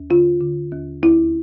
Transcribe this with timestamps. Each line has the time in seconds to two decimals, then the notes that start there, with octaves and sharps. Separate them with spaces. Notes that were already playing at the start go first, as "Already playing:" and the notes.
Already playing: D#2
0.10 D3 F4
0.41 D3
0.72 D#2
1.03 D2 E4